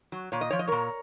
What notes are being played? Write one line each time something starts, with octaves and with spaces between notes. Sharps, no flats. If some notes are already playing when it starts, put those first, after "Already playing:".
F#3
A#2 C#5
D#5
F3 C#5
D#5
A#2 A#4 C#5